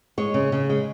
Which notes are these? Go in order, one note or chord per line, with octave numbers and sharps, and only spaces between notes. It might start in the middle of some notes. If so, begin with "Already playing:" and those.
G#3 C#5
C#3
C#3
G#3